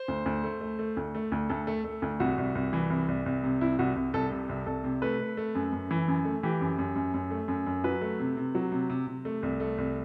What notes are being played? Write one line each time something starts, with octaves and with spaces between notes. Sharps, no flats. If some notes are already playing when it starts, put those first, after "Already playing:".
Already playing: C5
D2
D2
A3
A3
A3
D2
A3
D2
D2 A4
A3
A3
D2
C2 F#4
C2
C2
E3
C2
C2
C2
C3
C2 E4
C2 F#4
C2
C2 A4
C3
C2
C2 A4
C3
A3 B4
A3
A3
F#2
F#2
E3
F#2
A3
E3 G4
F#2
F#2
F#2
F#2
A3
F#2
F#2
F#3 B4
A3
C3
C3
F#3
C3
C3
C3
A3
C2
A3
C2